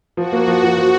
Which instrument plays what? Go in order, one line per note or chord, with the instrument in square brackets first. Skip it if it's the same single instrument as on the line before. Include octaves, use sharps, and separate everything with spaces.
[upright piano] F3 [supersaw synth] F#4
[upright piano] A#3
F3
F3
F3